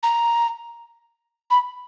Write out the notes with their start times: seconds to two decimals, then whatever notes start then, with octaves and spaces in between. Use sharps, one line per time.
0.03 A#5
1.50 B5